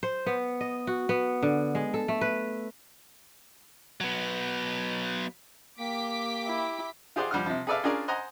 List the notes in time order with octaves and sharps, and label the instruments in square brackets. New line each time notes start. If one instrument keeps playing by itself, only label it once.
[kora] C5
B3
D#5
F#4
B3
D3
G#3
A4
A3
B4
[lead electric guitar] F#3 B3
[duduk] A#3 [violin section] G4 D6 B6
[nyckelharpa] E4
[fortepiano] F4 G4 G#4 C5 D5 F#5
F3 G3 F#5 F6
C3 F3
G#4 A4 B4 D5 E5 F5
C#4 D4 F4 G#4 A#4 D5
C5 D#5 F#5 G#5 A#5